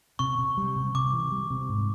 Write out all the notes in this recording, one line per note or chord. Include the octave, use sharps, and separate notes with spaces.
C3 C#6
C3
G3
C3
C3 D6
E3
G3
C3
G#2